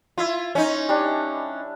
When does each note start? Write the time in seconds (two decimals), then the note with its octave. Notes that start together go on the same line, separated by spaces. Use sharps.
0.18 E4 F4 E5 C6
0.55 C#4 D#4
0.89 G3 D4